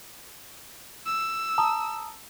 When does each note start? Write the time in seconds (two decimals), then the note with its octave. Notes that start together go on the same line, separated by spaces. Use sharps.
1.06 E6
1.58 A5 A#5 D#6